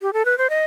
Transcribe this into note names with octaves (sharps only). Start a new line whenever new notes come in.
G4
A4
B4
C5
D#5